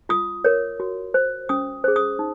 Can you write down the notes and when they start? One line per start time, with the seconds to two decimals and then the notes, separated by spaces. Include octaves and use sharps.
0.09 F4 D#6
0.44 A#4 C#5
0.80 F#4
1.14 C5
1.49 C#4 D#6
1.84 G#4 C5
1.96 D#6
2.19 D#4